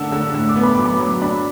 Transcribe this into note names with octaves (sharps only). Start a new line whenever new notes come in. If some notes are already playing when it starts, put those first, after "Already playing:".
Already playing: D3 D4 F#5 A5 E6
D3 E6
A2 E6
D6
B3
B5
F#3 D6
B5
F#3
D4 B5